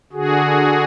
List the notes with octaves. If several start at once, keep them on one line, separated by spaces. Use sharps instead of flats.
D3 F#4 G#4